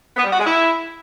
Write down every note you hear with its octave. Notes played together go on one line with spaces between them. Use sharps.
B3
G3
F#4
G#3
E4